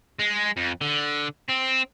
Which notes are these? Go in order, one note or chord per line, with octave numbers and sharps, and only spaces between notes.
G#3
F2
D3
C4